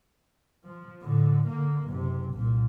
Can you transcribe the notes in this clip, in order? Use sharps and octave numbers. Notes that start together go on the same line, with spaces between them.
F3
A2 D3
D3 A#3
F#1 C3
C2 A#2